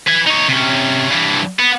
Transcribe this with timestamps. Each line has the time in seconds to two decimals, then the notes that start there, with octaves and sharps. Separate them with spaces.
0.07 B4 G#5
0.27 D#4 C#5
0.48 C3 C#4
1.10 G2 E3
1.59 B3